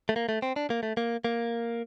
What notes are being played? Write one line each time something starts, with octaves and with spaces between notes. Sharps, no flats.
A3
A#3
A3
C4
D4
A#3
A3
A#3
A#3